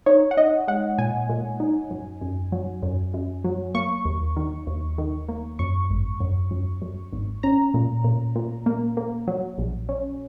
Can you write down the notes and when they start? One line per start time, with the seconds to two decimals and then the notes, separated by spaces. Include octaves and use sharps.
0.06 D#4 C#5
0.31 F#5
0.37 D#4 D#5
0.68 G#3 F#5
0.98 A#2 G#5
1.29 A#2
1.60 D#4
1.91 F#2
2.21 F#2
2.52 F#3
2.83 F#2
3.14 F#2
3.44 F#3
3.75 A#3 C#6
4.05 D#2
4.37 D#3
4.67 D#2
4.98 D#3
5.29 A#3
5.59 F#2 C#6
5.90 G#1
6.21 F#2
6.51 F#2
6.82 F#2
7.13 G#1
7.43 C#4 A#5
7.74 A#2
8.04 A#2
8.36 A#2
8.66 A#3
8.97 A#3
9.27 F#3
9.58 A#1
9.89 C#4